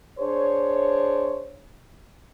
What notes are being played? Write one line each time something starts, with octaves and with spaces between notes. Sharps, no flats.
D4 G#4 C5 C#5